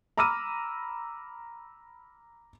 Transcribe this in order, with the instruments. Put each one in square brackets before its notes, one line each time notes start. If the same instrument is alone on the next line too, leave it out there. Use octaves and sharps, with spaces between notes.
[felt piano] A#5 B5 D6 E6 F6 D#7